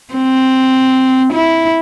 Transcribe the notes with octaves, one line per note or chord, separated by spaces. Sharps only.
C4
E4